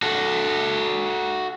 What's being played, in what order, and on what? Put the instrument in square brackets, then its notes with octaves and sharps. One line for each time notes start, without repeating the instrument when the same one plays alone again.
[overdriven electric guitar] F#4 A4